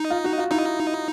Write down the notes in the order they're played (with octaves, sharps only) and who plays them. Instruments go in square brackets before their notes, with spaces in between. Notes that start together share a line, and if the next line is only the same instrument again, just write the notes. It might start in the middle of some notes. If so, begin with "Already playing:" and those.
Already playing: [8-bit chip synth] D#4
[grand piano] F4
F#4
F4
[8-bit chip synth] D#4 [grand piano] E4